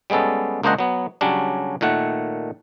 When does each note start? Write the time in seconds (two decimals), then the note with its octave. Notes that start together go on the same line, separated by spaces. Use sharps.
0.10 G3 G#3 B3 C#4 A4
0.63 C#2 A#3 D4 C5 D#5 F#5
0.79 F#3 B3
1.21 C#3 F#3 G3 C#4 D4
1.81 A#2 D#3 A3 F#5